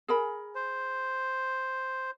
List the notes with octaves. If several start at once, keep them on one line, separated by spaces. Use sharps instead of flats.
G#4 A#4 B5
C5